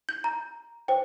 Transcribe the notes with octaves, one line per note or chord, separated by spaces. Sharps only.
G6
A#5
C5 G5